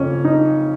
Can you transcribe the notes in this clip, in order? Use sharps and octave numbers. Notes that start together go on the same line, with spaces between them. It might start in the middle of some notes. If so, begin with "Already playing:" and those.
Already playing: F2 C#3 C#4
D#4